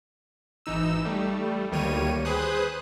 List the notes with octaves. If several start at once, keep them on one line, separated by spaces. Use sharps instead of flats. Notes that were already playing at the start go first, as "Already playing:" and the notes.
G#1 E3 D#4 E6
G3 A3
D2 D#3 G3 A#3 C#5 D#7
G#4 B4 C5 D#6 F#6